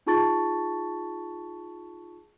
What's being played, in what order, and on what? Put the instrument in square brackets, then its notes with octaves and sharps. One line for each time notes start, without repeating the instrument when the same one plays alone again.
[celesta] D#4 F4 G#4 A5 C#6 A6